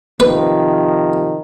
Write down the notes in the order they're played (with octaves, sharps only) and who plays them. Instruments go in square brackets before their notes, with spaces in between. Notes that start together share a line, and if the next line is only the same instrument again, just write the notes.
[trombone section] C3 D#3 F3 [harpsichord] B4